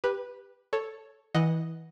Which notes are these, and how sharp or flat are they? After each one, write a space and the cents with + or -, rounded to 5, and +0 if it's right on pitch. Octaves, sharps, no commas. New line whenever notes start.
G4 +15 B4 -5
A4 +0 C#5 +0
E3 -20 D#5 +0 F#5 +0